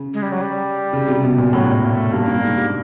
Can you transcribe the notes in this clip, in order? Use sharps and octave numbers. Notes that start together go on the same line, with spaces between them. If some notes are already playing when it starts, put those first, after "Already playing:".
Already playing: C#3
G#3
G3
F#3
G3
C#3
C3
B2
A#2
A2 F#3
G#3
A#3
A3
G2 A#3
G2
G#2
G2